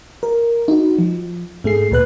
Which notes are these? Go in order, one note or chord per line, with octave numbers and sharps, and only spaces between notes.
A#4
D#4 F#4
F3
G#2 A3 G#4 C7
D2 A#2 B4 F#6